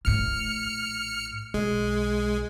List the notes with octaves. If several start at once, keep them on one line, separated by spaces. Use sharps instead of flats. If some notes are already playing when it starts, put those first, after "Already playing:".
A#1 A2 F6 C#7
B1 G#3